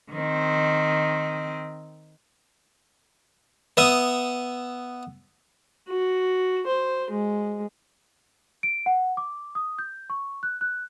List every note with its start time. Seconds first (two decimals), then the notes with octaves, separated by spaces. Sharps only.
0.12 D#3 C4
3.77 B3 E5 D#6
5.89 F#4
6.67 C5
7.11 G#3
8.63 D7
8.86 F#5
9.17 D6
9.55 D#6
9.79 G6
10.10 C#6
10.43 F#6
10.61 F#6